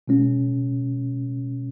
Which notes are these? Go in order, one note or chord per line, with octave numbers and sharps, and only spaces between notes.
B2 G#3 C#4